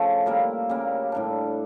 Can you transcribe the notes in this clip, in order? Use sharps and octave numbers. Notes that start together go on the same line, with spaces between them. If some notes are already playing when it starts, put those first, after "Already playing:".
Already playing: C#3 F3 A3
G3 A#3 E4 A#4
C#3 G3 A#3
A2 G3 D4